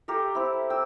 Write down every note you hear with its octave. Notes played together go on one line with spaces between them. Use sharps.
G4 A4 A#4
C4 E4
G5 E6